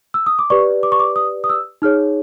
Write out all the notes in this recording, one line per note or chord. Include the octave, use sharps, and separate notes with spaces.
E6
D#6
D6
G4 B4 D5 C#6
D6
C#6
D6
D#6
D#6
E6
D#4 G#4 C#5 F6